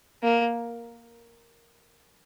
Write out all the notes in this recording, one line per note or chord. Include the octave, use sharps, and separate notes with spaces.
A#3